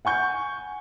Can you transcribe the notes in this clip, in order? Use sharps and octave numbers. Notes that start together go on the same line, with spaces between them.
F#5 G#5 C#6 G6